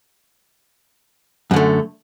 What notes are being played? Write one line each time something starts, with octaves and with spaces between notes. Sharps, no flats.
F#2 D3 A3